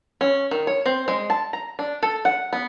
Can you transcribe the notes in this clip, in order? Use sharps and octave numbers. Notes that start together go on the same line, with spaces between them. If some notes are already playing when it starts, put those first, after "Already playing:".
C#4
D#3
C#5
C4
G#3
A5
A#5
D4
A4
F#5
B3